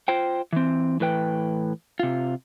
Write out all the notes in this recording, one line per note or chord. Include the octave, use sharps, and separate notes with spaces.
F4 C5 G5
E3 C4
A2 E3 B4 G5
C3 F4